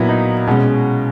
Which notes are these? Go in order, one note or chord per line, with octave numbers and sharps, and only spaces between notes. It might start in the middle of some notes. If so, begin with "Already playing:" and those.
Already playing: A#2 F#3 B3 E4
D#4
B2 G#3 C#4